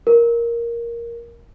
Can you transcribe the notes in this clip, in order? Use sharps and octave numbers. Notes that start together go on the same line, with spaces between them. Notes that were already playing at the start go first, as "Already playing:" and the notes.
A#4